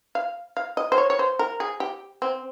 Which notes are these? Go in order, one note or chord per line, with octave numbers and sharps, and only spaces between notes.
F5
F5
D#5
C5
C#5
C#5
C5
A#4
G#4
G4
C4